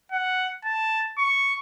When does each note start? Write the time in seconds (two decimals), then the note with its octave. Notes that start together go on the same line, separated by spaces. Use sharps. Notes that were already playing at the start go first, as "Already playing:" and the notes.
0.12 F#5
0.65 A5
1.18 C#6